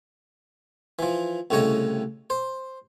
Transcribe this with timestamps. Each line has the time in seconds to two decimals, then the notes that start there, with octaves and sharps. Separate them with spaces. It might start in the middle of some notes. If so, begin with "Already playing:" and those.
0.99 E3 F3
1.50 C2 A2 C#3 C#5 D#5
2.30 C5